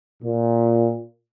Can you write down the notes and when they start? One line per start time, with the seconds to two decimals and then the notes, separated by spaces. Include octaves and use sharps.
0.21 A#2